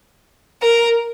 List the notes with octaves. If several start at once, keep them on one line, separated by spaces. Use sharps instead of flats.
A#4